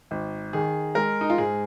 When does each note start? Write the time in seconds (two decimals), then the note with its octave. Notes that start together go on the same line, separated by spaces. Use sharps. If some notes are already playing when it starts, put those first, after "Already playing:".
0.11 G#1
0.53 D#3 G#4
0.95 G#3 A#4
1.21 D#4
1.30 F4
1.38 G#2 G#4